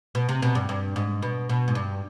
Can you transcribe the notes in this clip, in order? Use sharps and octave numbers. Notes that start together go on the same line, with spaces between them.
B2
C3
B2
G2
G2
G#2
B2
B2
G#2
G2